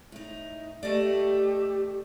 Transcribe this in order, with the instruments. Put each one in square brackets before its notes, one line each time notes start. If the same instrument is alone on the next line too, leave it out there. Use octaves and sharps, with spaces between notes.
[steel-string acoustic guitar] A2 D#4
[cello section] A3 [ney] G4 [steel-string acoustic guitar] D5 D#5